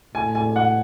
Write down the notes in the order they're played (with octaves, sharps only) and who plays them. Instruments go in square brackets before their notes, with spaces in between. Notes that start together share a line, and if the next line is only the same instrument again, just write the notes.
[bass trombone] A2 [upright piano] G#5
[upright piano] G#5
F#5